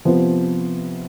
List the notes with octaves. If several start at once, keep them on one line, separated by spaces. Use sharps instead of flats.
C3 F3 B3 F4 C5